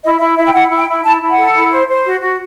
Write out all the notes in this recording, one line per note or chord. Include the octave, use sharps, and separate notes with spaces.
E4 D#5
E4 E5
E4 E5
G5
E4 F#5
E4
G5
E4
E4 A5
E4
F#5
A4
E4
C5
C5
F#4
F#4